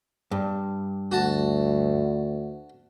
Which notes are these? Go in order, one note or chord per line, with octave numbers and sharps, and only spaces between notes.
G2
D2 F#4 A5